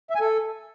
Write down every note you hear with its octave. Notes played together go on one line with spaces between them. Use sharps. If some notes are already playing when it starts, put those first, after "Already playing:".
E5
G#5
A4